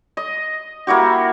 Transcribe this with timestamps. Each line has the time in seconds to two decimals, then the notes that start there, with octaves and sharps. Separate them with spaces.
0.17 D#5
0.87 A#3 E4 F#4 G4